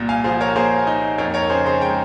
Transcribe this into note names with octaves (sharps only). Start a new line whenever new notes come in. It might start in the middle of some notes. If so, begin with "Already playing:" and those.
Already playing: C2 A#2
F5 G#5
F3 G#4 C5
A#4 C#5
A#3 G#4 C5
D#4
F2 A#4 C#5
A#4 C#5
C#3 G#4 C5
G#4 C5
G#3 G5 A#5